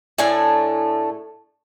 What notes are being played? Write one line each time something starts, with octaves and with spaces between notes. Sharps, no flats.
A2 A3 D4 G#5